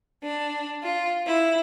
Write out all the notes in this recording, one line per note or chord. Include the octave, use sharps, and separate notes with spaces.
D4
F4
E4